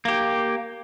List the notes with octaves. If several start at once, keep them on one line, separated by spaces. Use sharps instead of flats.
A#3 G4